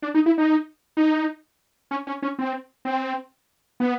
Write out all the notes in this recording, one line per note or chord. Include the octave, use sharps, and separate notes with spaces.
D4
D#4
E4
D#4
D#4
C#4
C#4
C#4
C4
C4
B3